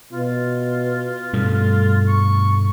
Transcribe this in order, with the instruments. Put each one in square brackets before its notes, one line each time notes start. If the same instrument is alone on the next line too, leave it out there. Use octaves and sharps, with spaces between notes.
[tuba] B2 [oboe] F4
[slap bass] G2 B2 G3 [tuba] A3
[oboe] C#6